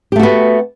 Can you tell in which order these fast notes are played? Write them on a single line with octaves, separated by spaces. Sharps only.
G4 A3 F#4 B3